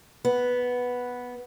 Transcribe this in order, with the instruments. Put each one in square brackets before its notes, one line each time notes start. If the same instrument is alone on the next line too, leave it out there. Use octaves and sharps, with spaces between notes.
[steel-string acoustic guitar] B3